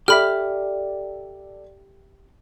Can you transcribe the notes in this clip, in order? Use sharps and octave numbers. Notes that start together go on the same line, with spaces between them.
G4 A4 D5 E5 B5 F6